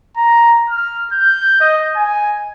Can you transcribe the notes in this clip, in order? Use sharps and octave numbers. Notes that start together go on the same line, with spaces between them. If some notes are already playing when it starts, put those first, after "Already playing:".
A#5
F6
G6
D#5
G#5